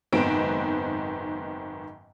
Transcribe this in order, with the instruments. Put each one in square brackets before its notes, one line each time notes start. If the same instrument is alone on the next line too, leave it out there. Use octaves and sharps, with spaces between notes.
[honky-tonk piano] F#1 G#2 D#3 B3 C4 D7